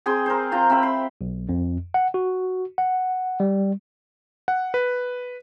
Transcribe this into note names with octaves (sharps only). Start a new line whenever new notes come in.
C4 G#4 G5 C6
A#4 C5
C4 F4 G5 A#5
C4 E5 G5 B5
C6
B1
F2
F#5
F#4
F#5
G3
F#5
B4